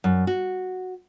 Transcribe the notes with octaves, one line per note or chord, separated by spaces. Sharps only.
F#2
F#4